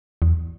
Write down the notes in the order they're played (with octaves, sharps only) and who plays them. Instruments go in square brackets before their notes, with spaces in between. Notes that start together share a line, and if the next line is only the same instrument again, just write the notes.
[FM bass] E2